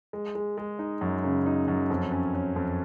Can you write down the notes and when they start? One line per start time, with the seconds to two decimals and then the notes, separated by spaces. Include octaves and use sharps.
0.13 G#3
0.35 G#3
0.58 G#3
0.79 D#4
1.01 F#2
1.24 C#3
1.46 D#4
1.68 F#2
1.90 F2
2.12 C#4
2.35 C#4
2.56 F2